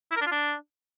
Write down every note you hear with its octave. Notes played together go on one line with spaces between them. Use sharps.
E4
A#4
D4
F4
D4